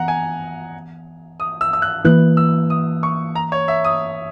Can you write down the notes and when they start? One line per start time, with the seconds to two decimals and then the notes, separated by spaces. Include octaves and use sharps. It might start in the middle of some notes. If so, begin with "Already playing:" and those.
Already playing: E3 B3 F#5 A#5
0.08 G#5
1.40 D#6
1.61 E6
1.73 E6
1.82 F#6
2.05 E3 A#3 E4 B4 F#6
2.37 E6
2.70 D#6
3.03 C#6
3.35 A#5
3.52 C#5
3.68 E5
3.84 D#6